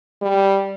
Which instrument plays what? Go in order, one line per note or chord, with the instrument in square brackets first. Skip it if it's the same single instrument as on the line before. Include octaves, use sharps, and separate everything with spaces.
[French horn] G3